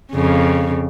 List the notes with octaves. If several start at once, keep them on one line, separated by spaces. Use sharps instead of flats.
F2 C#3